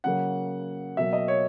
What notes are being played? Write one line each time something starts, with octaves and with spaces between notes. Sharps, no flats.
C#3 F#3 A#3 F#5
B2 F#3 A#3 E5
D#5
C#5